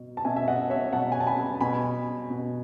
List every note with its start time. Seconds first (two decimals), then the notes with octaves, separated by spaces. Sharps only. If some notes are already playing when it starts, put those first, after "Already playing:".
Already playing: B2
0.17 A5
0.25 B2 E5 G#5
0.36 E5
0.48 D#5 F#5
0.70 C#5 E5
0.93 B2 F#5 A5
1.12 G#5
1.20 A5
1.27 G#5 B5
1.61 B2 G#5 B5
2.30 B2